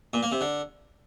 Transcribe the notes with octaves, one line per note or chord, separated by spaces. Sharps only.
A#2
A#3
C3
D3